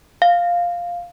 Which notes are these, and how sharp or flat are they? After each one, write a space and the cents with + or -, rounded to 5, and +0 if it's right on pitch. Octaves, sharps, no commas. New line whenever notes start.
F5 +0